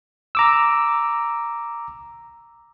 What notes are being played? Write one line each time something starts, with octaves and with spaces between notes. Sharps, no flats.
A#5 D6 E6